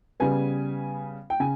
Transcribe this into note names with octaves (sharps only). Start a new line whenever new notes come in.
C#3 G3 B3 G#5
G5
C#3 G#5